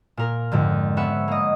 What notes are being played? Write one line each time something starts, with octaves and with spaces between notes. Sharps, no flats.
A#2 A#4
F2 G#2 D3
B3 C#4 E5 F#5
A#3 D#5